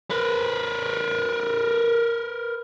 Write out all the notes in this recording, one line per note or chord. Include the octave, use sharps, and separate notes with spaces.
A#4 B4